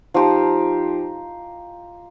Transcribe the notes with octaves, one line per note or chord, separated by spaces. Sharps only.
F3 D#4 G4 C5